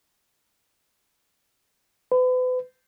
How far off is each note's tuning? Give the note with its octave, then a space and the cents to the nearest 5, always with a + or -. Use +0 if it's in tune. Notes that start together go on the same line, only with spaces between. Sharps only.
B4 +40